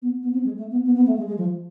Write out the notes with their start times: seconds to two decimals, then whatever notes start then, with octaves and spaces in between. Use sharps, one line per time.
0.02 B3
0.23 B3
0.33 C4
0.44 G#3
0.58 A3
0.71 B3
0.85 B3
0.96 B3
1.06 A3
1.17 G#3
1.27 G#3
1.38 F3